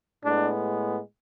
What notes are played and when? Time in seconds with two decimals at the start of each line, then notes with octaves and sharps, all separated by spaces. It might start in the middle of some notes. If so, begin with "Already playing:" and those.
0.24 A2 G#3 B3 D4